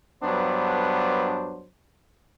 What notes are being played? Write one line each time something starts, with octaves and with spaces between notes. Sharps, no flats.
G2 F#3 B3 D4 C5